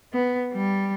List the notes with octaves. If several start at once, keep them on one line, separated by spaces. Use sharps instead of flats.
B3
G3